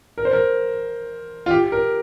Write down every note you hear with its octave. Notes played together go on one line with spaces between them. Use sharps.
A#4
C5
A#4
F4
G4
A#4